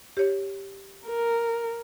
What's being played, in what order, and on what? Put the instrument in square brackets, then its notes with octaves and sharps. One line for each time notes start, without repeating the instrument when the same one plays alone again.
[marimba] G4 C#5
[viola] A#4